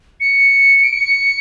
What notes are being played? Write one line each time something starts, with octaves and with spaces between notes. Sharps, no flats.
C#7
D7
C#7